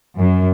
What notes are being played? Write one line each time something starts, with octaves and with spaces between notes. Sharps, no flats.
F#2